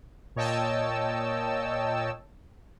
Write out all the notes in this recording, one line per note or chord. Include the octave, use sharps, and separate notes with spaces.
A#2 C#5 D#5 G5 A5 E6